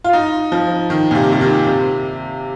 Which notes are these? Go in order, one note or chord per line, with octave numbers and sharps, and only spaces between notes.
F4
D#4
F3
D#3
A#2
C3
C3
D#3
C3